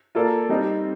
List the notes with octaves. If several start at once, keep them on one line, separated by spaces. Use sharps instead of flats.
A#3 F4 A4 D5
G3 C4 D#4